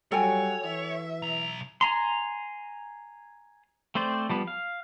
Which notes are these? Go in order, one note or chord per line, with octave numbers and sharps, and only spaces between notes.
F#3 G3 A4 C#5 G5 G#5
E3 E5
B1 A#5
G#5 A#5 C6
A3 C4 C5 D5
F3 G3 B3
F5